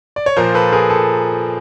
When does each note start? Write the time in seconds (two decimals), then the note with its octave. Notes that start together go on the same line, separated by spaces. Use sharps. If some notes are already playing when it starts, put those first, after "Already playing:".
0.16 D5
0.26 C#5
0.36 A#2 F3 A#4 C5
0.54 A4 B4
0.73 G#4 A#4
0.90 A4